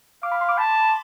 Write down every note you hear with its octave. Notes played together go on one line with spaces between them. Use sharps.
F5 D6
B5
C6
D6
A5 B5